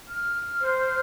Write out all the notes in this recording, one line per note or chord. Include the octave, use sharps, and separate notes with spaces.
F6
C5
F6